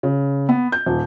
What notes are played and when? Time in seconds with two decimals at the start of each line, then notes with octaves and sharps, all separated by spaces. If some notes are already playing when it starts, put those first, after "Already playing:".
0.03 C#3
0.49 B3
0.72 G6
0.86 D#1